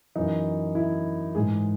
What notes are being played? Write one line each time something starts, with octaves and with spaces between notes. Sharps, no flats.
F#2 E3 D#4
E4
G#2 E3 G#4